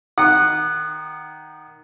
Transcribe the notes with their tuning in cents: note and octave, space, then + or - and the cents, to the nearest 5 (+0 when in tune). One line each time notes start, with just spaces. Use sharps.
D#3 +0 F#5 +0 D#6 -35